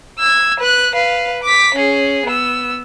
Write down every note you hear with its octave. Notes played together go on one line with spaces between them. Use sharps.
E6 G#6
B4 F#6
B4 F5
D6 B6
C#4 G#4
B3 E6